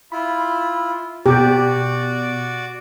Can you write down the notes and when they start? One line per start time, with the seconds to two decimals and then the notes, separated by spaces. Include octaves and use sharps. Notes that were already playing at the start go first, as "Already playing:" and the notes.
0.12 E4 F4 B5
1.26 B2 F#4 G4 D5